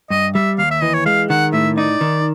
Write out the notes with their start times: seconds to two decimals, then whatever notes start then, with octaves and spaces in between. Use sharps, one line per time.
0.10 G2 D#5
0.35 G3 E5
0.58 D#2 F5
0.71 E5
0.82 E3 D#5
0.94 C#5
1.06 G#3 F5
1.30 D#3 F#5
1.53 A2 E5
1.77 D#4 D5
2.01 D#3